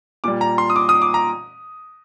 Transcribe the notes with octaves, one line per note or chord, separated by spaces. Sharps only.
A#2 G3 D6
A#5
C6
D#6
D6
D#6
D6
A#5